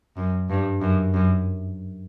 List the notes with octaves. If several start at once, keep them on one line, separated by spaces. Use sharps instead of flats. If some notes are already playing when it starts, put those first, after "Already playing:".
F#2
G2
F#2
F#2